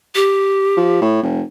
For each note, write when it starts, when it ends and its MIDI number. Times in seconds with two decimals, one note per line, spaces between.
0.15 1.01 67
0.77 1.01 53
1.01 1.20 45
1.22 1.42 29